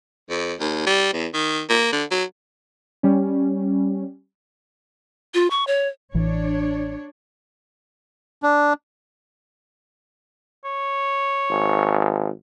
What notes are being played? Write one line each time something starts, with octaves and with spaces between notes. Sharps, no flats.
F2
D#2
G3
E2
D#3
A#3
D3
F#3
G3 C#4
F4
C#6
C#5
A1 E3 D4 C#5
D4
C#5
G#1